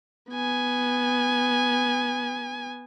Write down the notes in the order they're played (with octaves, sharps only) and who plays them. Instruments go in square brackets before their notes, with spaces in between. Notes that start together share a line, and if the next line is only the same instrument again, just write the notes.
[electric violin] B3 G#5